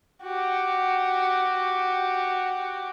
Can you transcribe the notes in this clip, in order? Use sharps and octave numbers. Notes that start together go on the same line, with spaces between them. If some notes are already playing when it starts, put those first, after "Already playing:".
F#4 G4